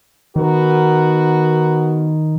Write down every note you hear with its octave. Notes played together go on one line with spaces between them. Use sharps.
D#3 B3 F#4 A#4